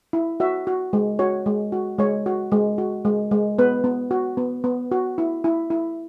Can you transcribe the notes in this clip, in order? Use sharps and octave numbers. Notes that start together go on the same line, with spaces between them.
E4
F#4 E5
F#4
G#3
F#4 C#5
G#3
F#4
G#3 C#5
F#4
G#3
F#4
G#3
G#3
B3 B4
B3
F#4
B3
B3
F#4
E4
E4
E4